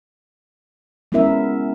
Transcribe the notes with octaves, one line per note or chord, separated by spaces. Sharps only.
G#3 B3 C#4 E4 A#4 E5